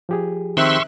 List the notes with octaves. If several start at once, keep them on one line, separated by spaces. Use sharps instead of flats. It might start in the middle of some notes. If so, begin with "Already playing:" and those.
F3 G4 G#4
D#3 C4 E5 C6 C#6 E6 F#6